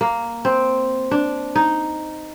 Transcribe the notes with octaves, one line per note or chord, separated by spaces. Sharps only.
A#3
C4
D4
D#4